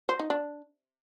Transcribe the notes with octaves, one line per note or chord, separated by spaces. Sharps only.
C5
D#4
D4